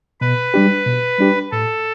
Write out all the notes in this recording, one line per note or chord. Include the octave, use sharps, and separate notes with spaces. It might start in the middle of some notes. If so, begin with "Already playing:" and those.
B2 B4
G3 D4 G4
B2
G3 D4 G4
A2 A4